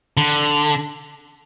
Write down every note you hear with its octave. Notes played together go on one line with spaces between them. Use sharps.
D3